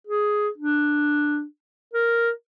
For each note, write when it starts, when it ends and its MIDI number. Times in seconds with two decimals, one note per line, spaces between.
0.07 0.48 68
0.58 1.44 62
1.94 2.30 70